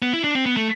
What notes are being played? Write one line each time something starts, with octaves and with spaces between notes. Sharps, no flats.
B3
E4
D4
C4
B3
A3